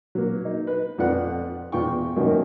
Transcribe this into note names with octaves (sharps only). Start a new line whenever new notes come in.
F#3 A#3
D#4
B4
F2 F4 B4 D5 F#5
E2 F4 G5 C#6
F#2 B2 D#3 A#3